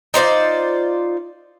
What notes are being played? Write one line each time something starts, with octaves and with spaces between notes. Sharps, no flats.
D#4 F4 C5 D5